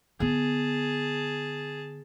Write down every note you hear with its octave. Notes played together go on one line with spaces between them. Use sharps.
D3 B3 G#4 A5